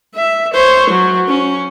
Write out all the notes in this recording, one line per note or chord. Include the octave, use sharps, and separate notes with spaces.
E5
C5 C#5
F#3
C#4